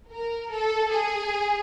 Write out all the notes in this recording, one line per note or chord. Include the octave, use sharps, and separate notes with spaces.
A#4
A4
G#4